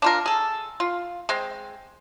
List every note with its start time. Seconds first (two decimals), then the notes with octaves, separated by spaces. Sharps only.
0.02 D4 F4 A#4
0.26 G#4 A4
0.80 F4
1.29 G#3 C4